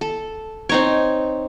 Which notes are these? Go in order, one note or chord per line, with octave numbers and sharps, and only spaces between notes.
A4
C4 D#4 C#5